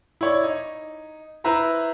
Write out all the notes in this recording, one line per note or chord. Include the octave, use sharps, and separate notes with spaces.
E4 C#5 D5
D#4
E4 B4 C5 E5 A#5 C6